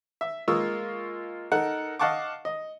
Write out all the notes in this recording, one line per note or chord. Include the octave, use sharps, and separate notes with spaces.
E5
G#3 A#3 F4 C#6 D#6 E6
D#4 A4 A#4 F#5
D#5 F5 F#5 A5 C#6 D6
D#5